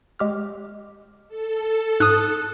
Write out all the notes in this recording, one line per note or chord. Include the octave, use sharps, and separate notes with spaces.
G#3 G4 F6
A4
G#2 D#6 F#6